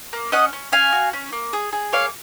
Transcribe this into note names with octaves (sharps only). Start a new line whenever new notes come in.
A#3
C#4 D#5 F#5
C#4
C#4 F5 G#5
F#4
C#4
A#3
G#4
G#4
A#3 C#5 F5